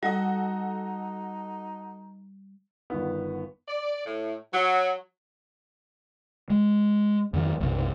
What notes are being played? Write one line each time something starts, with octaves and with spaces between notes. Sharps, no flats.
G3 D#4 F#4 A4 D#5
G1 D#3 B3
D5
A2
F#3
G#3
F2 D#3 F#3
B1 F#2 C3 F#3